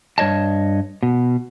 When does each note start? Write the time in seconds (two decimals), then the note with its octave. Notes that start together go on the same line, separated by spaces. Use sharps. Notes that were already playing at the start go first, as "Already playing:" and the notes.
0.18 G2 C#5 D#5 A5
1.03 B2